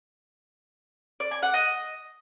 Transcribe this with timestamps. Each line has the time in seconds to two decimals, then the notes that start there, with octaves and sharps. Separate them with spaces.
1.20 D5
1.31 G#5
1.42 F#5
1.54 D#5